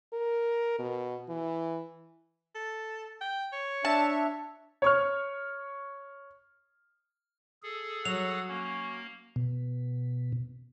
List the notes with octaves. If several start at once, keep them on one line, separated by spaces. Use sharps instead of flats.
A#4
B2
E3
A4
G5
C#5
D4 E5 A5
C#5 C#6 F6
G#4 A4
F#3 F#4 F7
A#3 C#4
B2